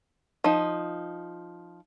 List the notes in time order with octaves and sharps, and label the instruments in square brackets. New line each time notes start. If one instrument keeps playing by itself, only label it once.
[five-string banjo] F3 D#4